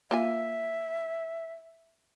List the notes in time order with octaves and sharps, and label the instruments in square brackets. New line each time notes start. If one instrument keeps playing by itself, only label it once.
[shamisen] A#3 F4 G#5 [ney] E5